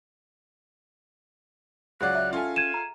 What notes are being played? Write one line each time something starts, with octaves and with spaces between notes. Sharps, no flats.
C#2 F#3 G#4 D5 F#5 F#6
E5
C#4 F4 A4 G#5
G#6 D#7 E7
A#5